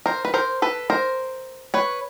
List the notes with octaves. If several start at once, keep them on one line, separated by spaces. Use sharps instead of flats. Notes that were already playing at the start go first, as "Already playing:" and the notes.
A#4 C5
B4
A#4 C5
A4 B4
A#4 C5
B4 C#5